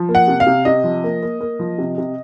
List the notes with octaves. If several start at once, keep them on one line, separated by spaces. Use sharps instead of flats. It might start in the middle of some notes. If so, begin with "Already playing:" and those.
Already playing: F3
A#3
F#5
C3
F5
C3
C3 D#5
F3
A#3
A#3
A#3
F3
C3
C3